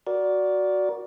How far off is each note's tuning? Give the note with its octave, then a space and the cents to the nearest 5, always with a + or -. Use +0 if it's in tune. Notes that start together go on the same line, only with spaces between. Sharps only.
F#4 +0 A#4 +15 D5 -10